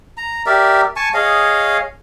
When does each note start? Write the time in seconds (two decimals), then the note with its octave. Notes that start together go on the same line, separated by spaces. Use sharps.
0.17 A#5
0.46 G4 A#4 D5 E5
0.96 G#5 A5 C#6
1.14 G#4 C#5 D#5 F5